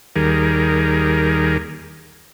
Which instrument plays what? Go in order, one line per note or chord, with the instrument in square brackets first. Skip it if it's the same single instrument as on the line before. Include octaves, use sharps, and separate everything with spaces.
[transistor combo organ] D#2 D#3 G3 G#4 A#4